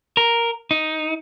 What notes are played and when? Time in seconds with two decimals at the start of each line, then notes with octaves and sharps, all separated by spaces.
0.17 A#4
0.71 D#4